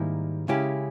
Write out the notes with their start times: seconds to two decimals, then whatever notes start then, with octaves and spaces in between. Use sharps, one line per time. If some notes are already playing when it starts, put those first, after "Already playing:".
Already playing: G#2 D#3 G3 A#3 E4
0.48 C#3 G#3 C#4 E4 G4